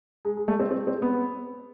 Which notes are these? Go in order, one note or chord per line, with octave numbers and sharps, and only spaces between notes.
G#3
G#3
A3
C4
C4
C4
B3